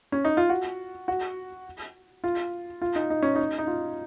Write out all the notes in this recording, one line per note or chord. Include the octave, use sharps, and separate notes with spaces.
C#4
D#4
F4
F#4
F#4
F4
F4
D#4
D#4
C#4
D#4
D#4
F4